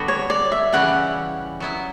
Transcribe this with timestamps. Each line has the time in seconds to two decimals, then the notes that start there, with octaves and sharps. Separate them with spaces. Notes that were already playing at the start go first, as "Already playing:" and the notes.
Already playing: D3 G3 B3 F#4
0.08 C#5
0.30 D5
0.52 E5
0.73 C#3 E3 G3 C#4 E4 F#5
1.60 F#3 B3 E4